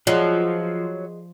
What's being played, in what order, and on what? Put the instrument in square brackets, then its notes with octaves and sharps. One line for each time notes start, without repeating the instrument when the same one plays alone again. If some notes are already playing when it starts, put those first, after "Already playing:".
[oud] F3 [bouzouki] F#3 [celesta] F4 [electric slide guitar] G#4 D#5 F#5